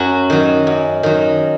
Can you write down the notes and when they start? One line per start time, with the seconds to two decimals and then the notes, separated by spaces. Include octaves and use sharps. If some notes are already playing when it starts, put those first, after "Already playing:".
Already playing: F#2 F#3 F#4
0.30 D#3 F#3
0.67 F#2
1.03 D#3 F#3